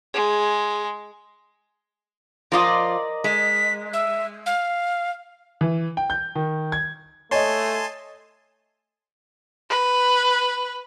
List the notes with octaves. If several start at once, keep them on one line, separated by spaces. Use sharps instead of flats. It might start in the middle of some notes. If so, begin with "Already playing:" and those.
G#3 G#4
F3 F4 A#4 D5 D#5
G#3 B6
E5
F5
E3
G5
G6
D#3
G#6
A3 C#5 D#5 G#5 A5 C6
B4